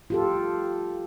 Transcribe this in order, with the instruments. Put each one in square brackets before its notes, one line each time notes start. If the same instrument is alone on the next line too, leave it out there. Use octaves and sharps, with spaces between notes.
[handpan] F4 G4 A4